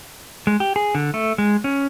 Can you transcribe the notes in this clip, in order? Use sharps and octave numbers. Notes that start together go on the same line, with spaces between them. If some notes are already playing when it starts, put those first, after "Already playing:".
G#3
G4
G#4
D3
A3
G#3
C#4